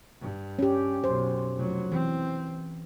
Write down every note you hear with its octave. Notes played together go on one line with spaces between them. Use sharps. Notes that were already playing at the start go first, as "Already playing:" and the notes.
G2
C#4 G4
B1 F#2 C5
F1 F#3
E3 C4